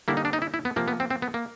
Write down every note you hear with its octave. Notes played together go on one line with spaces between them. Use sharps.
D3 G3 A#3 E4
D#4
D4
D#4
E4
E4
B3
C3 F3 A#3
B3
C4
C4
B3
A#3